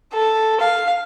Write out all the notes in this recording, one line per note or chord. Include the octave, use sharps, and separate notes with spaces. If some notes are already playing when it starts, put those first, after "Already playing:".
A4
F5